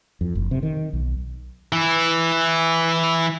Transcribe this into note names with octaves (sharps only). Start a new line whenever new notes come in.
F2
F#1
C3
D#3
B1
E3 E4